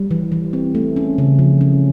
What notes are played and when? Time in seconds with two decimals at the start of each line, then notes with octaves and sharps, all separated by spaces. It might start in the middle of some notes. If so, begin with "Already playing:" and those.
Already playing: G3
0.11 E3
0.32 E3
0.53 C4
0.75 A3
0.96 C#4
1.18 C#3
1.39 F3
1.61 C#4